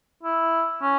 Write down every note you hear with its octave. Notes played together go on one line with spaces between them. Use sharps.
E4
C#4